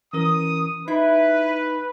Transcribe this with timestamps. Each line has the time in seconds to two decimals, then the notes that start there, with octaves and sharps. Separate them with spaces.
0.13 E3 C#4 A#4 D#6
0.88 D#4 E4 B4